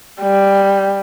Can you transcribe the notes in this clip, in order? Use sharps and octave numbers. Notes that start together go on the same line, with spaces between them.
G3